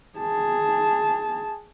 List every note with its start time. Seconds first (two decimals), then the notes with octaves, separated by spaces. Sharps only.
0.19 G#4 A5